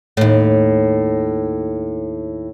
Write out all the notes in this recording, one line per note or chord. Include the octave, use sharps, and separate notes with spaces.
D#2 A2